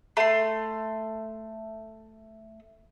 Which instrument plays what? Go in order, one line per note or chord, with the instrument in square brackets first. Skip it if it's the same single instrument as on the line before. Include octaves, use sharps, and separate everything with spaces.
[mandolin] A3 C6